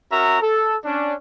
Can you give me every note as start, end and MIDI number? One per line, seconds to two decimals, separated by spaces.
0.12 0.41 61
0.12 0.41 66
0.12 0.41 70
0.12 0.41 76
0.12 0.41 82
0.41 0.76 69
0.84 1.14 61
0.84 1.14 62